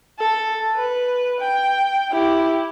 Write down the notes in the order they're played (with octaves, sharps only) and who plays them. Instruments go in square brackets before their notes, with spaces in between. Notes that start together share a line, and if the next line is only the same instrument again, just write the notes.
[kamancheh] A4
B4
G5
E4 G4